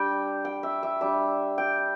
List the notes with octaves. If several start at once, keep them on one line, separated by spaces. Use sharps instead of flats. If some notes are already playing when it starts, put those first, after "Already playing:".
Already playing: G3 D4 G5
G5
E5
E5
G3 D4 E5
G5